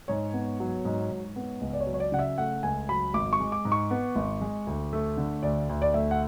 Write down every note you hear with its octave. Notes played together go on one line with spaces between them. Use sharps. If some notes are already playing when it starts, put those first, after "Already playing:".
G#2 C#5
B3
F#3
G#2
G#2
B3
C#2
D5
C#5
F#3
C#5
D5
C#3 F#5
E5
A3 F#5
C#2 G#5
F#3 B5
G#1 D6
C#6
G#3
D6
G#2
C#6
B3
G#1
G#3
D2
A3
D3
D2 D5
D2
D5
A3 E5
F#5